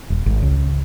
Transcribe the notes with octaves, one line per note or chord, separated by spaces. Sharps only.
D#1
G#1
C#2